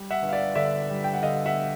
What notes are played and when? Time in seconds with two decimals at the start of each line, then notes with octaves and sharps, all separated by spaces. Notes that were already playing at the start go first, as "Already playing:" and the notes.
Already playing: G3
0.11 E5 F#5
0.22 G1
0.29 F5
0.33 D5 E5
0.55 D3 D5 E5
0.90 G3
1.04 G5
1.14 F#5
1.23 D3 D#5 F5
1.46 E5 F#5